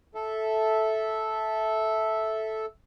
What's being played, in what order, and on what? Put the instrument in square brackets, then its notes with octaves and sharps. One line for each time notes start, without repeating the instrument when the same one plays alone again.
[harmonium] A4 E5